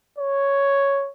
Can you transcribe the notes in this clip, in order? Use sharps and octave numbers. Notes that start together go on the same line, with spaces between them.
C#5